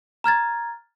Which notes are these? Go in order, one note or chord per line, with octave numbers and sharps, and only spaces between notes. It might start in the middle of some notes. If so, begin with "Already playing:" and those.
A#5 F6 G#6 A6